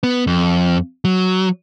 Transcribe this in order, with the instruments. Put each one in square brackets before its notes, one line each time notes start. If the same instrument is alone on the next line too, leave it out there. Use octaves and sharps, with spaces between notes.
[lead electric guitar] B3
F2
F#3